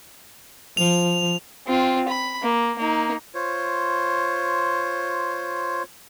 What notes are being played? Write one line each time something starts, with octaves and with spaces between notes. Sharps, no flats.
F3 F7
C4 F4
B5
A#3
A#3 D#4
F4 C5 C#5